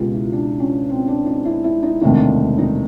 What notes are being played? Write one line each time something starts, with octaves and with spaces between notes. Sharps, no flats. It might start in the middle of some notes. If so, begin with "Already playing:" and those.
Already playing: C#2 B2 F4 G4
E4
D4
C#4
C4
D4
D#4
E4
E4
D#4
E1 D2 C3 D#3 D4
D#4